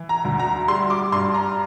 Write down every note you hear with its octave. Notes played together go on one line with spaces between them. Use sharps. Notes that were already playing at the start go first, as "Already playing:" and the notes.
Already playing: E3
A#5
D2
A#5
G3 C6
D6
G2 C6
A#5